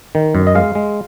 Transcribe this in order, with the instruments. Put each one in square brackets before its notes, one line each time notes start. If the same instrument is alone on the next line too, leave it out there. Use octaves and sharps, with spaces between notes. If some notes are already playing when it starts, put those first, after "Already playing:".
[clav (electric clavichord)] D#3
F#2
D#5
G#3 F5
G#3